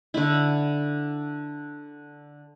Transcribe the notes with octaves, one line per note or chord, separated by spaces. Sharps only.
D3 E4